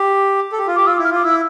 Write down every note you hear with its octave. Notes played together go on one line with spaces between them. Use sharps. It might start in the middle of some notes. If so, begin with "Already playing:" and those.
Already playing: G4
A4
G4
F4
G4 D6
F4 E6
E4
F6
F4 D6
E4 E6